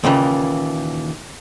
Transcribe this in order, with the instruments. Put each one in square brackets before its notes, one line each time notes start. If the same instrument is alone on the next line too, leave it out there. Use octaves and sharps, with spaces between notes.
[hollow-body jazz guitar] D#2 A#2 C#3 E3